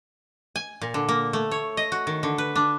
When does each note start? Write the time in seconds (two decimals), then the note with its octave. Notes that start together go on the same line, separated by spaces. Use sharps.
0.56 G#5
0.81 A#2
0.94 D3
1.09 A#3
1.33 A3
1.51 C#5
1.77 D#5
1.92 F#4
2.07 D#3
2.23 D3
2.38 B4
2.56 D4